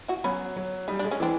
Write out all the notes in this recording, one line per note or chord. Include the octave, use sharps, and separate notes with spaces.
E4 F#4
F#3 B3 C#4
F#3
G3 D#4
D4
G#3
C#4
E3 C4 D4